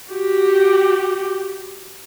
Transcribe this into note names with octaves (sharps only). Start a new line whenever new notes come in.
F#4 G4